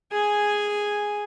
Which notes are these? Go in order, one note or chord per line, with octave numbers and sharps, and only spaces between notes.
G#4 G#5